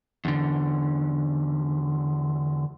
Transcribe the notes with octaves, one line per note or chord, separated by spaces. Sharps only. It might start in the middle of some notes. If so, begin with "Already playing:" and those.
E2 D3